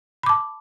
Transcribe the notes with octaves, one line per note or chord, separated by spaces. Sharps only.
A5 B5 D6